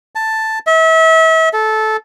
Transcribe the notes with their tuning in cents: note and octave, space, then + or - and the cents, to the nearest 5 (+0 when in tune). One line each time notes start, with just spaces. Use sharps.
A5 +5
E5 -35
A4 -15